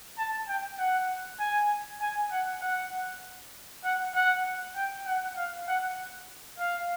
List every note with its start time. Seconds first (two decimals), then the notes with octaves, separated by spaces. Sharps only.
0.18 A5
0.48 G5
0.79 F#5
1.40 G#5
2.01 G#5
2.32 F#5
2.62 F#5
3.84 F#5
4.15 F#5
4.76 G5
5.06 F#5
5.37 F5
5.68 F#5
6.59 F5